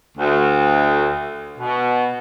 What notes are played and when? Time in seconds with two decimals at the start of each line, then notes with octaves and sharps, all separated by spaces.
0.17 D2
1.58 B2